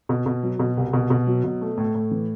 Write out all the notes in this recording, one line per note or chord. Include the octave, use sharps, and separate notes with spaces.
B2
B2
F#3
B2
C2
B2
B2
F#3
B2
A3
A2
A2
E3